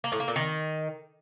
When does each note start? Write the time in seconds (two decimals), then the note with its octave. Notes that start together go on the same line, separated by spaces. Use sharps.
0.04 A#3
0.12 A2
0.20 A#3
0.28 A#2
0.36 D#3